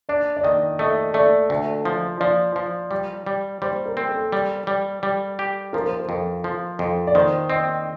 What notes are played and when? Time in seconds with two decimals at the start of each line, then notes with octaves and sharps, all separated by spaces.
0.09 D4 D5
0.37 D5
0.44 D#3 D#5
0.79 A3 D#5
1.14 A3 D5
1.50 D2
1.85 F3
2.20 F3 D5
2.56 F3
2.91 G3
3.27 G3
3.62 G3 C5
3.86 A#4
3.97 C4
4.09 A4
4.32 G3
4.67 G3
5.03 G3
5.39 G4
5.73 F3 A#4
5.86 C5
6.00 A#4
6.09 F2
6.44 F3
6.79 F2
7.07 D5
7.15 D#3 C5
7.50 C4 D#5